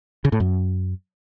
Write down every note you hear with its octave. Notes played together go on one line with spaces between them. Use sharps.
C#3
A2
F#2